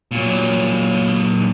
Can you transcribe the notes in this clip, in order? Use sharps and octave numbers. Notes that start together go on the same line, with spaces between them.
A#2 F#3